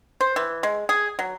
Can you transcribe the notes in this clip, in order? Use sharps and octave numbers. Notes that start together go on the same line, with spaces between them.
C5
E3
G#3
G#4
F#3